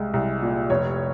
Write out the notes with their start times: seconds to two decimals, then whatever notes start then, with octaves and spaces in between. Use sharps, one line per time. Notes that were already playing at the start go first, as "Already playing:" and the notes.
Already playing: C2 G#3
0.13 C2
0.42 A#2
0.70 F1 C#5